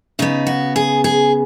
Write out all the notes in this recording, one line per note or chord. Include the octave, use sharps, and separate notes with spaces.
C#3 B3 D#4
F#4
G#4
G#4